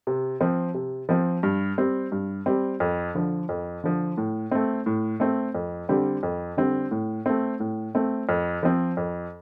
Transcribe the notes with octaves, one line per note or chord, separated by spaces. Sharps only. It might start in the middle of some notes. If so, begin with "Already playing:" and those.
C3
F3 C4
C3
F3 C4
G2
G3 C4
G2
G3 C4
F2
D3 F3
F2
D3 F3
A2
A3 C4
A2
A3 C4
F2
D3 G3 C4
F2
D3 G3 C4
A2
A3 C4
A2
A3 C4
F2
F3 C4
F2